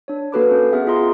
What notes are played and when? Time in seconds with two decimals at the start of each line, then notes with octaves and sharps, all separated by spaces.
0.08 D4 C#5
0.32 A#3 F#4 A4 B4 B5 D6
0.51 C#4
0.72 B3 G#4 E5 F#5
0.87 F4 G#4 D#5 A#5 C6 D#6